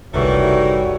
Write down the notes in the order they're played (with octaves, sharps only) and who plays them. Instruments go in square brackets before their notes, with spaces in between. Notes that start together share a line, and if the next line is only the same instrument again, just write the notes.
[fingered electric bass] F#1 C2 [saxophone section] D#3 E3 A3 [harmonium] G3 F#4 C#5